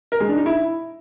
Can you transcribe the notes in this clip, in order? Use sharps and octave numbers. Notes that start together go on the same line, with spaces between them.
A#4
G#3
D4
D#4
E4